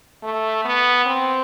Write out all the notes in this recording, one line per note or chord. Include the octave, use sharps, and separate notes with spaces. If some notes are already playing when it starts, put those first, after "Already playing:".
A3
B3
C4